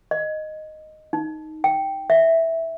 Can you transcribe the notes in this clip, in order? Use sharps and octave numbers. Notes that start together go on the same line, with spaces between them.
D#5
D#4
G5
E5